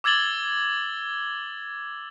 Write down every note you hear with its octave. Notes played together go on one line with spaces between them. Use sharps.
D6 E6 G#6 A6 F#7 G7